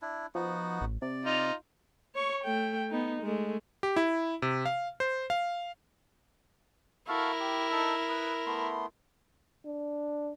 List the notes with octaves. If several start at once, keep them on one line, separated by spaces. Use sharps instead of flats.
D4 E4
F3 B3 D#4 F#4
A1
C3 D5
D#4 F4
C#5 C#6
A3 G5
B3 D#4
G#3 A3
G4
E4
C3
F5
C5
F5
E4 F#4 A4 A#4 F5
G4
D#4 A4 E6
B4 D#6 E6
A3 B3 C6
D4